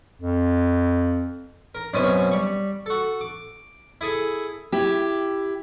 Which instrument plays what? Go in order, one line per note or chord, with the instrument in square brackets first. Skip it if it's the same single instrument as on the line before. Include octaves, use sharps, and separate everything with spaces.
[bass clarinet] F2
[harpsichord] A#4 A#5
F#2 B2 C4 C#4 C#5 G#5
G3 C#6
F#4 A4
D6
E4 G#4 A4
[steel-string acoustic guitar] E4 G4